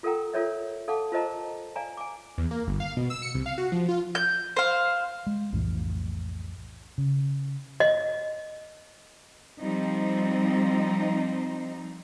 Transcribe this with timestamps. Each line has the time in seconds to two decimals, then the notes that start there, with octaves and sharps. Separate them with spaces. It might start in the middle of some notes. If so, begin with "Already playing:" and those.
0.03 F4 A4 A#4 F#5 G5 A#5
0.33 F4 A4 A#4 C#5 D5 E5
0.88 A4 F5 F#5 A5 D6
1.12 F4 A#4 C5 D#5 A5 A#5
1.76 D5 F5 G#5 A#5
1.97 G#5 D6
2.38 E2
2.51 A#3
2.67 G1
2.80 F5
2.97 B2
3.10 E6
3.22 C#7
3.34 C2
3.46 F5
3.58 F#4
3.72 F3
3.89 F4
4.15 G6
4.57 C5 F5
5.27 G#3
5.53 B1 F2 A2 E3
6.98 C#3
7.80 D#5
9.60 F3 G3 C4 D#4